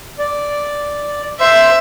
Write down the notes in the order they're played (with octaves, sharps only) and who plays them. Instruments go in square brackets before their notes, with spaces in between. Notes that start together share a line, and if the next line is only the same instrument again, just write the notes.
[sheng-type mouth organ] D5
[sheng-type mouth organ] C5 C6 [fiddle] E5